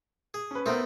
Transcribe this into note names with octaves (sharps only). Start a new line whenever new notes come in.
G#4
C#4 B4
A3 B3 C4 D#4 A#4 C5